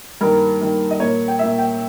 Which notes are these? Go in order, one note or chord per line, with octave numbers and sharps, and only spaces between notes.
G2 D#3 A#3 A#4
G2 D#3 A#3
D#5
A#2 A#3 C#5
G5
A#2 A#3 E5
G5